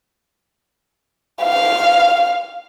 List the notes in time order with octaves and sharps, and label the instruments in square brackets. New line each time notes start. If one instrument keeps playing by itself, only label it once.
[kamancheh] F5